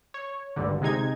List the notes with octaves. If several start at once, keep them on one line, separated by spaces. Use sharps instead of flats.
C#5
G#1 D2 G2 D3
C3 G#3 D#4 G#6